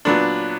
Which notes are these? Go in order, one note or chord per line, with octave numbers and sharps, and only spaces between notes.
A#2 F#3 B3 D4